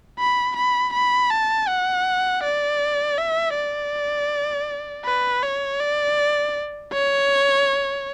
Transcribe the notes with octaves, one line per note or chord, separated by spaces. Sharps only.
B5
B5
B5
A5
F#5
D5
E5
D5
B4
C#5
D5
C#5